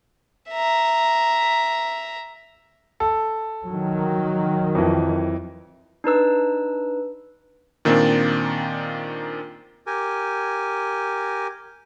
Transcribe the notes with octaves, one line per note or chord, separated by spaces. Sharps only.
E5 A#5
A4
D#3 F#3
F2 E3
D4 D#4 B4 E6
A#2 D#3 A#3 C4 D4
G4 A#4 G#5